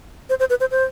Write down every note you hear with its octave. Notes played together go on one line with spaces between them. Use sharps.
C5
C5
B4
C5
C5